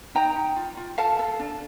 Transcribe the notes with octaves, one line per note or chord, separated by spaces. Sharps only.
D#4 G5 A#5
D#4
F4
F4
A4 F5 A5
A4
D4